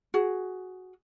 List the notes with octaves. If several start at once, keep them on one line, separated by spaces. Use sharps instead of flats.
F#4 G#4